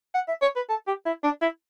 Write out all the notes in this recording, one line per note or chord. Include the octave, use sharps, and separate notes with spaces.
F#5
E5
C#5
B4
A4
G4
E4
D4
E4